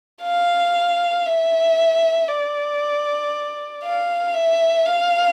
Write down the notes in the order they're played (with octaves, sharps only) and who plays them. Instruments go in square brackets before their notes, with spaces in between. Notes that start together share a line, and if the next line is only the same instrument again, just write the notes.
[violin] F5
E5
D5
F5
E5
F5